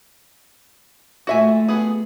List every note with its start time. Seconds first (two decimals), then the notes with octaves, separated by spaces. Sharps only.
1.27 A#2 A3 F#4 E5 G#5
1.68 B3 G#4